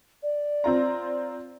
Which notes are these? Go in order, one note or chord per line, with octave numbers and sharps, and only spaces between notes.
D5
C4 F4 A#5